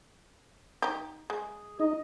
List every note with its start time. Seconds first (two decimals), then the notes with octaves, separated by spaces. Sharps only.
0.82 D#4 G4
1.30 G#3 G#4
1.80 D#4 D#5